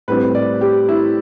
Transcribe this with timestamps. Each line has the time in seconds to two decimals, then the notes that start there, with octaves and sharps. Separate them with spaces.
0.08 A2 G3 C4 B4
0.35 D5
0.61 G4
0.89 E4